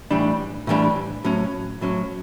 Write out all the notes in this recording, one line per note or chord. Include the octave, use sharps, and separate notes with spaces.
A2 E3 G3 D4
A2 E3 G3 D4
A2 F#3 C#4
A2 F#3 C#4